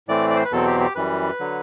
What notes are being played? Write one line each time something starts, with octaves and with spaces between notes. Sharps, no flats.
A2 E3 A3 C4 D5
D5
C5
B4
E2 B2 F#3 C4 A4
G4
G4
F#2 E3 G3 B4
D3 F#3